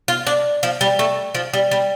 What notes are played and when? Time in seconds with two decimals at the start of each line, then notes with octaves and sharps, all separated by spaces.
0.08 F4
0.27 D4
0.63 F3
0.81 G3
0.99 A3
1.35 F3
1.53 G3
1.71 G3